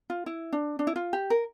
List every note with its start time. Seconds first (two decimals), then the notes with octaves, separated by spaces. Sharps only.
0.10 F4
0.26 E4
0.53 D4
0.79 D4
0.87 E4
0.96 F4
1.13 G4
1.30 A#4